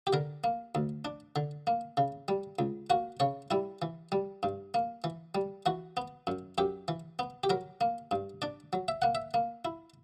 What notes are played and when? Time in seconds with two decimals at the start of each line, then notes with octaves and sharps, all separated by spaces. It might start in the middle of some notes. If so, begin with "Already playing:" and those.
0.07 G4
0.13 D3 A#4
0.44 A#3
0.75 D2
1.05 D4
1.36 D3
1.67 A#3
1.97 C#3
2.28 G3
2.59 C#2
2.90 A#3 F#4
3.20 C#3 C#5
3.51 G3 E4
3.82 E3
4.12 G3
4.43 G2
4.74 A#3
5.04 E3
5.35 G3
5.66 E3 F#4
5.97 B3
6.27 F#2
6.58 F#2 G4
6.88 E3
7.19 B3
7.44 G4
7.50 F#3 A#4
7.81 A#3
8.11 G2
8.42 D4 D5
8.73 F#3
8.88 E5
9.02 A#3 F#5
9.15 E5
9.34 A#3
9.65 E4